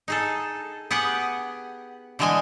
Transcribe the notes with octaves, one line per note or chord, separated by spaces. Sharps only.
D#4 G#4 A4
B3 G4 G#4 F#5
D3 E3 G3 G#3 D#5 G#5